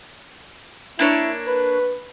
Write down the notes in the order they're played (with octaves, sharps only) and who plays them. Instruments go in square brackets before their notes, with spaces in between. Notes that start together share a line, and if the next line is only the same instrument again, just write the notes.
[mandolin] A#3 D4 C#5 [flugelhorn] E4
[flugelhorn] B4